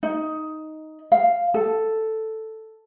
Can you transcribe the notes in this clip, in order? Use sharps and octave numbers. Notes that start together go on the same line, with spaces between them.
D#4
F5
A4